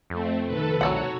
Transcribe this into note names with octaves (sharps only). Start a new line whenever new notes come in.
F2 A3 C4
F1 B2 D#3 A4 B4
C2 F#3 F#4 A4 C#5 F#5